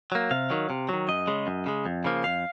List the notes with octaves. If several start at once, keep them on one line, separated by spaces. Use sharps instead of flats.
F#3 A#3
C3 F5
D#3 F#3
C3
D#3 F#3
F#2 D#5
C#3 G#3
F#2
C#3 G#3
F2
C#3 F3 A#3
F2 F5